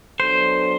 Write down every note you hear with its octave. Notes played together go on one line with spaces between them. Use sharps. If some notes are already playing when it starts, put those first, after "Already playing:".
F#3 B3 D4 A4 C5